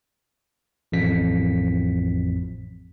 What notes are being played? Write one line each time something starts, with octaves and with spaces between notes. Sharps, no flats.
A1 F2 B6